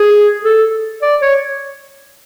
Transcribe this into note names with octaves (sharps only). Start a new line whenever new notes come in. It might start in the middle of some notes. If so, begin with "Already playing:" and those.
Already playing: G#4
A4
D5
C#5